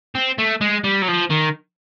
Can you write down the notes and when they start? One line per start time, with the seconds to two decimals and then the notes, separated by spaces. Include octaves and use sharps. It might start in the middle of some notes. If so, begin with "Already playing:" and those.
0.15 C4
0.38 A3
0.61 G#3
0.84 G3
1.02 F#3
1.08 F3
1.30 D#3